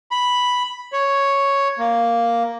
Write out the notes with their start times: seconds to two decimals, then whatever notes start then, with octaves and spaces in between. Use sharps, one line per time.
0.11 B5
0.93 C#5
1.78 A#3